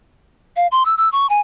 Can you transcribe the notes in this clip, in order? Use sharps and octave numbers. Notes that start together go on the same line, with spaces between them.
F5
C6
E6
E6
C#6
G#5